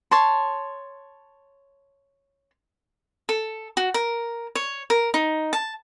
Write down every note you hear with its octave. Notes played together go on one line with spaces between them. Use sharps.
C#5 A5 C6
A4
F#4
A#4
C#5
A#4
D#4
A5